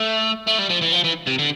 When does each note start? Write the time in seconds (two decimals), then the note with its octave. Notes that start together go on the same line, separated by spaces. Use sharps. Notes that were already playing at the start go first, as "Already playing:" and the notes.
Already playing: A3
0.47 A3
0.58 G3
0.69 F3
0.81 E3
0.92 F3
1.04 E3
1.27 C3
1.39 D3